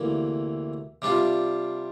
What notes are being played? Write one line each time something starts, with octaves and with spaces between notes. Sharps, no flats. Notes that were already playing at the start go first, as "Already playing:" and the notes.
Already playing: D2 C3 E3 A#3 E4
C3 G3 D4 F4